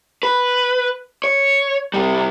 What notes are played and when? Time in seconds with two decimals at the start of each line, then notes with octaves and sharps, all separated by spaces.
0.23 B4
1.24 C#5
1.94 C3 G3